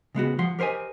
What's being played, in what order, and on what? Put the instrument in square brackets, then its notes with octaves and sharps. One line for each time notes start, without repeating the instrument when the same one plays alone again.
[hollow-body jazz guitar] C#3 G#3 B3 F#4
F3 F#5 C6
G4 A#4 C5 D#5 G#5